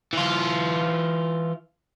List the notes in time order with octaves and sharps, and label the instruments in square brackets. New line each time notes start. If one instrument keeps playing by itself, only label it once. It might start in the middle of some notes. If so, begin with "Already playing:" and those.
[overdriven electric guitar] E3 F4